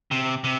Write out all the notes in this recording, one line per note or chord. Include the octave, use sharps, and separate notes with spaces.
C3
C3